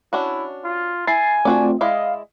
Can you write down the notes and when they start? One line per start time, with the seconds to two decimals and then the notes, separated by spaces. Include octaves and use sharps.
0.13 C#4 D4 E4 F#4
0.64 F4
1.07 E4 G#5 A6 C7
1.45 A3 C4 D4 F4 F#4 D5
1.81 G#3 E4 D5 D#5 F5